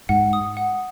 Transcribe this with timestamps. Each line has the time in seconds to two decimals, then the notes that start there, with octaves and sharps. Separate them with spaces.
0.09 G#2 F#5
0.33 D#6
0.57 F#5